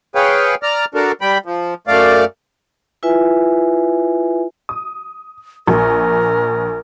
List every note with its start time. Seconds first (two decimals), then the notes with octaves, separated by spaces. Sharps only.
0.15 G#4 B4 C#5 F5 G5
0.63 D5 A#5 F6
0.95 D4 F#4 A4 A#4
1.21 G3 G5 B5
1.46 F3
1.87 F#2 A3 D5 F5
3.03 E4 F4 B4 E5 G#5
4.69 D#6
5.67 A#1 A#4